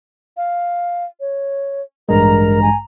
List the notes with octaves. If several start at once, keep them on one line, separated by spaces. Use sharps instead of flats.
F5
C#5
A1 G2 G#3 A#4 A#5
G#5